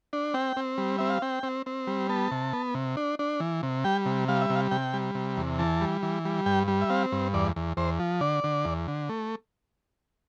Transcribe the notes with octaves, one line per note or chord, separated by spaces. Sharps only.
D4
C4 G5
C4
G3
C4 E5
F5
C4 G5
C4
C4
G3
B3 A5
C3
B3
C3
D4
D4
E3
C3
G3 G5
C3
G3 F5
E5
C3
F5
C3 G5
G3
C3
E2
E3 A5
G3
E3
G3
G2 G5
G3
E5
C4 F5
G2
E2 D5
E2
E2 C5
F3
D3 D5
D3
E2
D3
A3